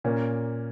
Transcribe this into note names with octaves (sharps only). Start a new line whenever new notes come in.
A#2 A#3 C#4